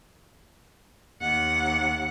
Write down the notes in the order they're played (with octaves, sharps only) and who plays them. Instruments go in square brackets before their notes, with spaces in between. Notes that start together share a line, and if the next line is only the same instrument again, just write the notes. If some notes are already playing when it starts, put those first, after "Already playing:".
[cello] D#2 F#5